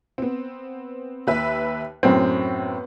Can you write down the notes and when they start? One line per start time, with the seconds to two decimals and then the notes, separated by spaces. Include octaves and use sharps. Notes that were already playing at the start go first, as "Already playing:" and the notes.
0.18 B3 C4
1.27 D#2 B4 E5
2.03 F#2 A2 B3 C4